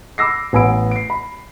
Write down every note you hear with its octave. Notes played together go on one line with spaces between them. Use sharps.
B5 D6 E6 A#6 C7
A1 B3 G#5 B5 E6 D7
C7 D7
B5